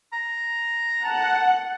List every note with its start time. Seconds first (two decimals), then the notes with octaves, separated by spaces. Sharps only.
0.13 A#5
1.05 F#5 A5